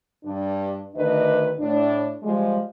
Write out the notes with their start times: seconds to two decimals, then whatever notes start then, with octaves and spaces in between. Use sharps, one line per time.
0.24 G2 D4
0.95 D2 D#3 D4 B4 D#5
1.58 A2 D4
2.23 F3 G3 G#3